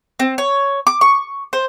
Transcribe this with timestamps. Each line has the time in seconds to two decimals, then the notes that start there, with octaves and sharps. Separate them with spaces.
0.19 C4
0.38 C#5
0.87 D6
1.01 C#6
1.53 C5